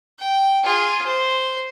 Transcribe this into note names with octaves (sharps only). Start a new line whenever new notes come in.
G5
F4 G#4
C5